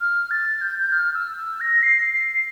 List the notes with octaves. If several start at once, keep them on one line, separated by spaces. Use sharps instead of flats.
F6
A6
G6
G6
F6
E6
E6
A#6
C7
C7